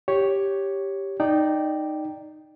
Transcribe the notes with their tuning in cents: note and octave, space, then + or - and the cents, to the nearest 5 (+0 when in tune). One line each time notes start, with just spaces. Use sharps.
G4 +0 C#5 +0
D#4 -10 D5 +0 G5 +0